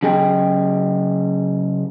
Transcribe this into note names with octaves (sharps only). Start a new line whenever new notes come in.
C#3 F#3 G#4 D#5 G5